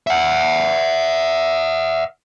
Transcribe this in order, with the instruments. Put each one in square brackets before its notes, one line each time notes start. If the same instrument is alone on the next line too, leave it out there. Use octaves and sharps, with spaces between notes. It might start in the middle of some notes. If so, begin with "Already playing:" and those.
[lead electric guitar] E5 F#5